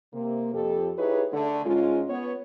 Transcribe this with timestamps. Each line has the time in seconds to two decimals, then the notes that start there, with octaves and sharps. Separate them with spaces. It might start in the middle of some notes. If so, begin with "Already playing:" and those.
0.14 C3 A#3
0.54 F2 G4 A4
0.99 D#4 E4 G4 G#4 B4 C#5
1.33 D3 A3
1.65 G#2 G#3 C#4 F4
2.10 B3 C#5